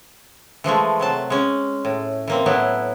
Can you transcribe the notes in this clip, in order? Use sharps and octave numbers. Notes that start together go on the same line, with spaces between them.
E3 F3 G#3 A3
C3 F#3 A5
G#3 C#4
A2
E3 A#3 C4
A2 F#3 B3 E4